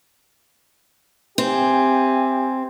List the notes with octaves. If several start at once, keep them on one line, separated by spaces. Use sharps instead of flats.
C4 G4 E5 G#5